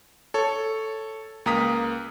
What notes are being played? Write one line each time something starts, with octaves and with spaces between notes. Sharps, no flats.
A4 C#5
C#2 A#3 A#5 D#6 B6